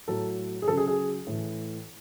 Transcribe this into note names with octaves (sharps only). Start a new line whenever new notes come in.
A2 F#3 A4
G#4
C#3 F#3 A4
G#4
G#4
A2 E3